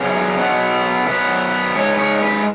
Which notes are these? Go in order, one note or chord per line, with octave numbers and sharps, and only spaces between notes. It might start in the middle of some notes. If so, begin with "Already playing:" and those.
Already playing: F#2 F#3 B3 G#4
B2 F#3 B3
F#2 F#3 B3 B4
G#2 E3 G#3 C#5
B4
C#5
B4